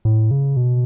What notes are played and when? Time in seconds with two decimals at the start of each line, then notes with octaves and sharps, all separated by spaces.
0.05 A2
0.31 C#3
0.56 B2